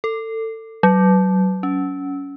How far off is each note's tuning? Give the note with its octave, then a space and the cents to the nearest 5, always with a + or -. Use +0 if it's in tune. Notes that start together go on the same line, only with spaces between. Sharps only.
A4 +25
F#3 +25
C#4 +20